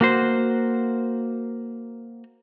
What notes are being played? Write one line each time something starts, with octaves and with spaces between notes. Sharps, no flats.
A#3 F#4 C5